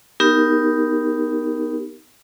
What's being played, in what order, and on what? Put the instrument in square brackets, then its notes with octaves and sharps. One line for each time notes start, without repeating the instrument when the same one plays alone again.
[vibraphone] B3 D#4 G4 A#4